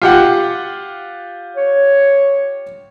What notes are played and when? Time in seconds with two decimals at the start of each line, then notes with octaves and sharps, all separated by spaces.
0.02 F4 G4 F#5
1.56 C#5